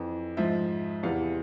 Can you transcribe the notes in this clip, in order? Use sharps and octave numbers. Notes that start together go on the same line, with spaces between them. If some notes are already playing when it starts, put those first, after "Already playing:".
Already playing: F2 E3
G#2 F3 E5
E2 C3 E3 F5